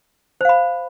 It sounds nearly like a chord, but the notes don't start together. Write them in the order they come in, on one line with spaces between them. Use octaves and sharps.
C5 F5 B5